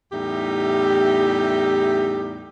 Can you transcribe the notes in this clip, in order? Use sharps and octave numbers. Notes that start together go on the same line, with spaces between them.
E2 A2 G3 D#4 G4